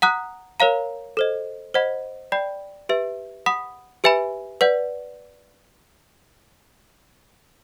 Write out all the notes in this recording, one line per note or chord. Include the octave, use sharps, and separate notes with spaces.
F#5 A#5 D#6 F#6
A#4 C#5 F5 A#5
A4 C5 D#5
C5 D#5 F#5 B5
D5 G5 B5
G4 B4 E5
F#5 B5 D#6
G4 B4 E5 G#5 B5
B4 D5 F#5